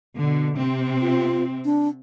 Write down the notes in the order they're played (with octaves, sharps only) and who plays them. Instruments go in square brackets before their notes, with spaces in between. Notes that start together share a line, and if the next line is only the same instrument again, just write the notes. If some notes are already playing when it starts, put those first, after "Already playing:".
[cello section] B2 D3
C3 C4
[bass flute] F4
D4